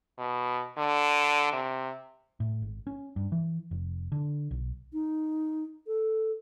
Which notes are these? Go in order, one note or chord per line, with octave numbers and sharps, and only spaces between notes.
B2
D3
C3
A2
G#1
C#4
G2
E3
F1
D3
B1
D#4
A4